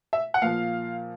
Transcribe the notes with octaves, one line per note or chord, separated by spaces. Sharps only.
E5
F#5
A#2 F3 F5